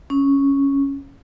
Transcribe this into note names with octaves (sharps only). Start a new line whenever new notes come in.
C#4